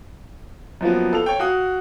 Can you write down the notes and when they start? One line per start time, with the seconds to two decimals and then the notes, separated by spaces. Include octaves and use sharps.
0.81 F#2 F3 A#3 B3
1.13 A4 F5 F7
1.26 C#5 G5
1.39 F#4 F5 D#6